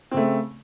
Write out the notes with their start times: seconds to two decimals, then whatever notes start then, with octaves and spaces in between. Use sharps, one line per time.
0.11 C4
0.14 C#3
0.17 A3